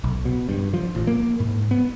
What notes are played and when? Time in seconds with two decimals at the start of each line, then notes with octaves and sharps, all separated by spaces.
0.04 B1
0.25 B2
0.49 G2
0.74 F3
0.95 A1
1.07 A#3
1.40 G#2
1.71 B3